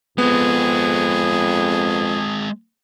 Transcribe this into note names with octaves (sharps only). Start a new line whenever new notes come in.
F2 G#3 B3 C4 G#4